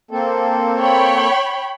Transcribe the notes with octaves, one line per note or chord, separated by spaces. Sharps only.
A#3 C4 A4
C#5 G5 B5